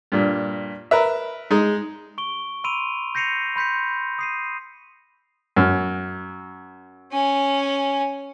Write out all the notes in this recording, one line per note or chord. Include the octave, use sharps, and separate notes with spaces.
G2 A#2
A#4 B4 E5
G#3 D#4
C#6 D7 G7
B5 C6 E6 D7 D#7 F7
G6 A#6 C7 C#7 D#7 F7
B5 C6 G6 B6 C#7
D#6 C7 D#7
F#2
C#4 G#5